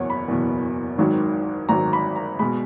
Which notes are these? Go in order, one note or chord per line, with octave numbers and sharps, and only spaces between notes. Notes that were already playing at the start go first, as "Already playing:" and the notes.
Already playing: F#1 E2 B2 C#5 F#5
B5
F#1 E2 B2
G#1 G#2 D#3 F#3
G#1 G#2 D#3 F#3 A#5
B5
A#5
B2 G#3 B5